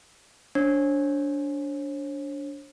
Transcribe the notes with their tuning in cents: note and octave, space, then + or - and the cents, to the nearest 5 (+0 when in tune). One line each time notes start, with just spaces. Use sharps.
D4 -25 C#5 -45